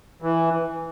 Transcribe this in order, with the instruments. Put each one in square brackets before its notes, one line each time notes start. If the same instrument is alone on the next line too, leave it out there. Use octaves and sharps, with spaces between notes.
[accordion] E3